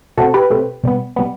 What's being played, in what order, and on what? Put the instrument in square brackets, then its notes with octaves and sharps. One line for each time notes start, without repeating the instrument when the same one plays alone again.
[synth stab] B2 A3 C4 F#4 A4
G4 B4
B2 A3 C4
B2 G3 B3
B2 G3 B3